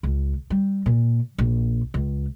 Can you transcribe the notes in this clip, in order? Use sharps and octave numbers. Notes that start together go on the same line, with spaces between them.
C#2
G3
A#2
A#1
C#2